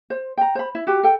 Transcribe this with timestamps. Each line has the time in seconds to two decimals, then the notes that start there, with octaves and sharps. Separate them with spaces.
0.10 C5
0.38 G5 A#5
0.55 C5 B5
0.75 E4
0.87 F#4 G4
1.03 A4 G5